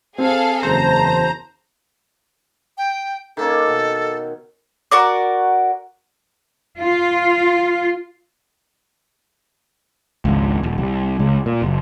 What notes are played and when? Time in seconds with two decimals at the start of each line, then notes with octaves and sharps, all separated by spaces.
0.18 C4 G#4 A4 F5
0.63 F#1 E2 C5 A5 A#5
2.78 G5
3.37 D#3 A#3 C#4 A4
3.67 B2
4.91 F#4 A#4 D5
6.79 F4
10.25 G#1 C#2
10.63 D#1
10.78 C2
11.19 C#2
11.46 A#2
11.62 F#1